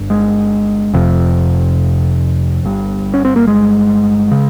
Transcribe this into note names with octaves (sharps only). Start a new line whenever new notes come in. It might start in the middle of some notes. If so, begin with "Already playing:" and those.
Already playing: G1 G2
G#3
F1 F2 C3
G1 G2
C#4
C4
A#3
G#3
C#3